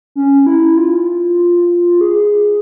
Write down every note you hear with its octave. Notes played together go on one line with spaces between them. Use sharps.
C#4
E4
F4
G#4